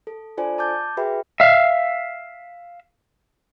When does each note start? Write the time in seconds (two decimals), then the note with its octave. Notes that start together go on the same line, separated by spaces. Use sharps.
0.07 A4
0.37 D4 F4 A4 C5 D5 G#5
0.58 A5 D6 G6 A6
0.97 F#4 G#4 B4 E5 G5 B5
1.40 E5 F5